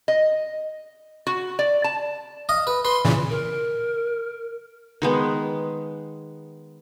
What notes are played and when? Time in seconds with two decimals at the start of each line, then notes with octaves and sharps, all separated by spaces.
0.08 D#5
1.27 F#4
1.59 D5
1.84 A5
2.49 D#5 F5 D#6
2.67 B4
2.85 B4 C6
3.05 A#2 C#3 E3
3.30 A#4
5.02 D#3 G#3 B3